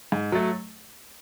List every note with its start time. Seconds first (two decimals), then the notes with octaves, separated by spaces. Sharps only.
0.12 G#2
0.32 F#3 A3